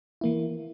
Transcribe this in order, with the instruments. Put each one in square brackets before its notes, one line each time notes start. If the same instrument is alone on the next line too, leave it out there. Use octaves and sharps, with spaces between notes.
[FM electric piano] E3 A#3 E4